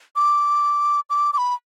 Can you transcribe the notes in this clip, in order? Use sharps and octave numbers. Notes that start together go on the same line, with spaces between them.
D6
D6
D6
B5